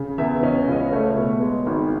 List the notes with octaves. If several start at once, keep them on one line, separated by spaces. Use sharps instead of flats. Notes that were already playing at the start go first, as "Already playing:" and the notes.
Already playing: C#3
E2 E5
C#4 D#5
C#2 D#5
C#5
A3 C#5
B2
G#3
G#1